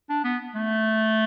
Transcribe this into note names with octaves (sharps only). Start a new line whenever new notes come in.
D4
B3
A3